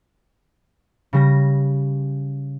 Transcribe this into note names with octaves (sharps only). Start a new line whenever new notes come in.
C#3 G3 A#6